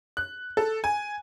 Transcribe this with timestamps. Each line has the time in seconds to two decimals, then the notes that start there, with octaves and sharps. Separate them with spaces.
0.17 F#6
0.57 A4
0.84 G#5